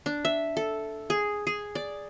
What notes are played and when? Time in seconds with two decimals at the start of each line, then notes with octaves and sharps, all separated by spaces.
0.06 D4
0.25 E5
0.57 A4
1.10 G#4
1.47 G#4
1.75 D5